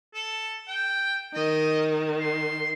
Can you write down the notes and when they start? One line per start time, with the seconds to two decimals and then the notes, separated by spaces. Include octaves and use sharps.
0.15 A4
0.68 G5
1.34 D#3 D#5
2.20 C6